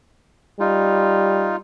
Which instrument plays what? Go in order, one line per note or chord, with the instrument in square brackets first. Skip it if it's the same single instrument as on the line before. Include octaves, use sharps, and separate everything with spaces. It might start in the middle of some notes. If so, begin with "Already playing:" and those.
[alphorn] G3 [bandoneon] D#4 F4